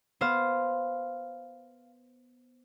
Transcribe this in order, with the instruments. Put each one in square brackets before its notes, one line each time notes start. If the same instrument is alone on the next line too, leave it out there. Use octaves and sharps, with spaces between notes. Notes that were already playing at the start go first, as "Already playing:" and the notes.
[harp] B3 C5 F5